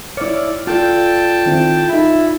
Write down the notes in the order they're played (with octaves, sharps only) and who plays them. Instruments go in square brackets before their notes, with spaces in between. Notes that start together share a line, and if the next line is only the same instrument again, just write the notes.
[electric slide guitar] E4 C#5 [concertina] D5 [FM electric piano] F6
[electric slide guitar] F4 A4 D5 [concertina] G5 A5
[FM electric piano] D#3 C4 E4
[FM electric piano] D#4 G#4 A6 [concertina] E4